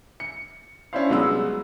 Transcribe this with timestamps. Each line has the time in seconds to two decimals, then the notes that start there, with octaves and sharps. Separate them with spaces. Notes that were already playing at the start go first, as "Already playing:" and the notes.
0.20 C#7
0.93 C#4 D4 E4 C5 F5
1.10 C2 F#3 G#3 B3 E6